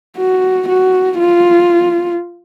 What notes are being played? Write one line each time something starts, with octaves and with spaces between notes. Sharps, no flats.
F#4
F#4
F4